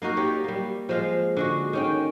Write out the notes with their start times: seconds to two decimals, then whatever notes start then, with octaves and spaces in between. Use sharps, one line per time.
0.02 A#3 D#4 F#4 A#4
0.17 G4 C#5 D5
0.44 G3 A#3
0.89 F3 G#3 F5
1.37 D3 G#3 F#4
1.73 D#3 C#4 G5